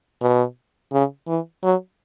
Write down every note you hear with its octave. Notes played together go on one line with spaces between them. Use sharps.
B2
C#3
E3
F#3